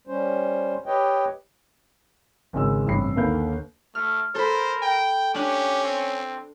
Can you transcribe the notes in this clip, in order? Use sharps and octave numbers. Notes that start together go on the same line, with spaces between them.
G3 C#4 C5
G4 B4 C#5 D#5 G5
G#1 C#3 G#3 E6
A1 G2 C3 B5 C7
D#2 D3 A#3 B4 F5 G6
A3 F6
A4 A#4 C5 B5
G5
C#4 D4 G4 F#6
C4